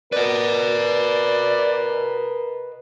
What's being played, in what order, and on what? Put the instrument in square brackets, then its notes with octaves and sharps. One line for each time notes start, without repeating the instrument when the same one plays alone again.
[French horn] A#4 [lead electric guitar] B4 D#5 [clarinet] D5